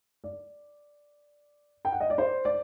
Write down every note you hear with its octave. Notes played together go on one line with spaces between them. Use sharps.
D5
G5
F#5
D#5
D5
C5
D5